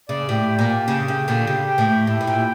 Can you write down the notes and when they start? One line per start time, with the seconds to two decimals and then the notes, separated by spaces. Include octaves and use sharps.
0.09 C#3 D5
0.28 A2 G4
0.49 G5
0.59 A#2
0.69 G4
0.88 C#3 G5
1.08 C#3 G5
1.28 A#2 D3 G4
1.47 C#3 G4
1.68 G5
1.78 A2
1.87 G4
2.07 A2 E4
2.21 A2
2.27 A#2 G5